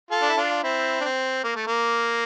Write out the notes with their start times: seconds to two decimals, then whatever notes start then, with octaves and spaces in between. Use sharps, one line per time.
0.11 F4 A4
0.22 D4
0.29 E4
0.37 D4 F4
0.63 C4 E4
1.00 D4
1.04 C4
1.44 A#3
1.56 A3
1.67 A#3